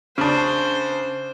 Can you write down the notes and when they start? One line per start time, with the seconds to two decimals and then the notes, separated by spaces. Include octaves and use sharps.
0.18 C#3 D4 C5